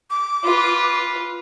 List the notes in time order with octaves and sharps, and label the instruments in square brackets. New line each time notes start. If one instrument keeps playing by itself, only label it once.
[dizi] D6
[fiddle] F4 B4